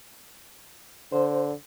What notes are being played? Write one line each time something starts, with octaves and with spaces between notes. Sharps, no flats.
D3 C5